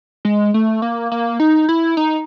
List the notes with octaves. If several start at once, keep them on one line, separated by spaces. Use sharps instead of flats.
G#3
A3
A#3
A#3
D#4
E4
D#4